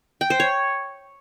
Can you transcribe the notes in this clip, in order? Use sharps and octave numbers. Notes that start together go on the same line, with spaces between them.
G5
C5
C#5